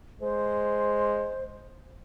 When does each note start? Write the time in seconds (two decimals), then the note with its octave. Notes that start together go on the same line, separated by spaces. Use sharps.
0.21 G#3 C5